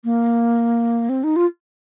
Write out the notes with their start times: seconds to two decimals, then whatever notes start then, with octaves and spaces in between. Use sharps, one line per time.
0.04 A#3
1.09 C4
1.24 D#4
1.36 F4